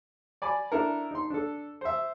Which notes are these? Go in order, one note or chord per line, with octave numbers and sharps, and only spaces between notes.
D5 G#5 B5 D6
D4 E4 A4 A#4
D#4 C6
D4 A4
C5 E5